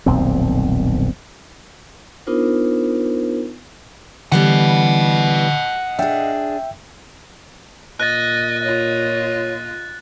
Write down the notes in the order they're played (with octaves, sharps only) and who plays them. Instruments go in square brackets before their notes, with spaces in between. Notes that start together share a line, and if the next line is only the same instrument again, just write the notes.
[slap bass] D#1 B1 F2 C4
[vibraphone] B3 D4 D#4 F4 A#4 C5
[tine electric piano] D3 [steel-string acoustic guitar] E3 G3 B3 [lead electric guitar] D#5 F#5
[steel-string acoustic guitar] D4 G#4 [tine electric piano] E5 G5
[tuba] A#2 [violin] D#5 [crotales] F#6 A6
[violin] F4 D#5 [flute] C#5